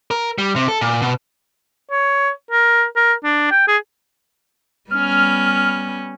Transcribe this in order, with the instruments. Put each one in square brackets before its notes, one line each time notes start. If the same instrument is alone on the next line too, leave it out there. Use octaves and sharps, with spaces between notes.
[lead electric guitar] A#4
G3
C3
A4
A#2
B2
[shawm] C#5
A#4
A#4
D4
G5
G#4
[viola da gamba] G3 B3 C#4 [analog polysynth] F6